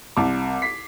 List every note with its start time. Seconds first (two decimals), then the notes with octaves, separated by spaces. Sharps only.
0.17 C2 A5 D6
0.62 B6 C7